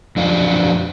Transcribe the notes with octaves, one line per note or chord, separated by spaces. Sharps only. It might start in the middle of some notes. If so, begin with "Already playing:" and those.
F2 F3 D4 D5 F5